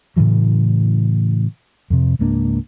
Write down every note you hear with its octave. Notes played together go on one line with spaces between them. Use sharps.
A2 C#3 E3 F#3
F2 C3
C#2 G#2 A#3 D4